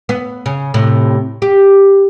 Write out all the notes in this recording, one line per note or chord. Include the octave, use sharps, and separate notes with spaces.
B3
C#3
A2 C3
G4